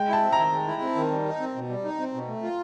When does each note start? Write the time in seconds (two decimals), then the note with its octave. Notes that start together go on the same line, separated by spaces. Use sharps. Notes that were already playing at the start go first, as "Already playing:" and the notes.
Already playing: G#3 G5
0.08 E4 A5
0.22 C4
0.33 D#3 A#5
0.51 G#3
0.67 E4
0.82 C4
0.95 D#3
1.11 G3
1.25 D#4
1.40 C4
1.55 B2
1.69 G3
1.85 D#4
1.99 C4
2.14 B2
2.28 A3
2.42 F4